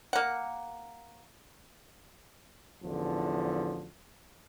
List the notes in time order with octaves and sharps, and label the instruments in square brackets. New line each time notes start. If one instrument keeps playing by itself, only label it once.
[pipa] A#3 F#5
[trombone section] A1 E2 D3 F3